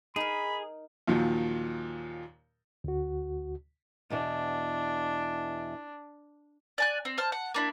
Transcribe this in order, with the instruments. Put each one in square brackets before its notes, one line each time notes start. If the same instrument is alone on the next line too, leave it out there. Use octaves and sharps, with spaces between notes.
[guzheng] D#4 A#4 [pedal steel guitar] G#4 [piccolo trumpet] B5
[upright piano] D#2 A#2 D#3 F3 F#3
[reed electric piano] D2 F#4
[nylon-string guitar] E2 B2 E3 [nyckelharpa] D4
[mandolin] D5 G#5 F#6
C4
C5 A5 F6
F#5
A#3 D4 E4